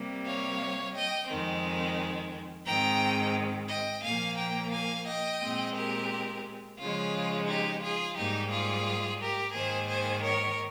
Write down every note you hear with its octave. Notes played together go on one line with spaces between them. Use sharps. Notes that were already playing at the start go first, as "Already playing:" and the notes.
Already playing: C3 G3 A#3
C#5 F5
D#5 G5
F2 D#3 G#3 C4
G#2 D#3 G#3 C4 G5 A#5
D#5 G5
A#2 F3 A#3 F5 G#5
G5 A#5
F5 G#5
D#5 G5
A#2 G#3 C4
G4 A#4
C#3 F3 G#3 F4
D#4 G4
F4 G#4
G#2 G3 A#3 D#4 G4
F4 G#4
G4 A#4
G#2 D#3 A#3 G#4 C5
G#4 C5
A#4 C#5